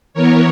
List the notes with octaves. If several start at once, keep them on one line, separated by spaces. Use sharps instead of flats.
E3 B3 A#4 C#5